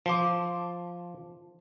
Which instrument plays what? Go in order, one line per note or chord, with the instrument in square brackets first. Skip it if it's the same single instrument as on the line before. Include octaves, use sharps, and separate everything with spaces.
[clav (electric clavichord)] F3 [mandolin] A5 C6 D6